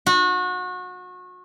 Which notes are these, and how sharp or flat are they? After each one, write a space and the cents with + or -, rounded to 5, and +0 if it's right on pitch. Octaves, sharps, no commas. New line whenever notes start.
F#4 -30